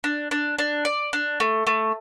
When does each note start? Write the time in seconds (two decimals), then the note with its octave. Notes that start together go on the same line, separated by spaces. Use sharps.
0.04 D4
0.31 D4
0.59 D4
0.85 D5
1.13 D4
1.40 A3
1.67 A3